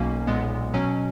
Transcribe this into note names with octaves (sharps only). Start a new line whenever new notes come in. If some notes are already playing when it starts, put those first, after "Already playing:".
Already playing: B1 B2 A#3 C#4
B1 A#2 G#3 B3
B2 F#3 C#4